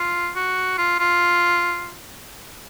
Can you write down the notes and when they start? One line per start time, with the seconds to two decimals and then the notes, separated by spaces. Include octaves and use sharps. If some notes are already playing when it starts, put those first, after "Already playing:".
Already playing: F4
0.36 F#4
0.78 F4
0.99 F4